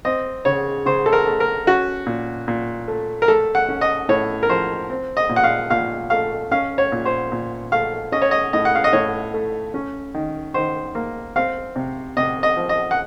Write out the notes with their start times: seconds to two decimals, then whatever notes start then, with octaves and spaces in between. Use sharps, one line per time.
0.05 C4 D#5
0.45 C#3 C#5
0.86 C#3 C5
1.06 A4
1.13 A#4
1.26 A3
1.40 A#4
1.67 C#4 F#4
2.06 A#2
2.48 A#2
2.88 A3
3.22 A#4
3.28 A3 A4
3.55 F#5
3.68 C#4
3.81 D#5
4.09 A2 C#5
4.43 A#4
4.49 F3 C5
4.90 C4
5.17 D#5
5.29 A#2
5.36 F#5
5.44 F5
5.70 A#2 F5
6.10 A3 F5
6.51 C#4 F5
6.78 C#5
6.92 A#2
7.05 C5
7.32 A#2
7.72 A3 F5
8.12 C#4 D#5
8.22 C#5
8.31 D#5
8.53 A2 D#5
8.65 F#5
8.75 F5
8.84 D#5
8.93 A2 C#5
9.34 A3
9.74 C#4
10.14 D#3
10.54 D#3 C5
10.95 A#3
11.36 C4 F5
11.76 C3
12.17 C3 D#5
12.43 D#5
12.56 F3
12.69 D#5
12.91 F#5